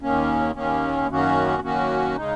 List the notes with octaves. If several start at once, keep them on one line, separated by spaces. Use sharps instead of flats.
D#2 D#3 A#3 C#4
D#2 D#3 A#3 C#4
F#2 D#3 A#3 C#4 F#4
F#2 D#3 A#3 C#4 F#4
C#3 G#3 D#4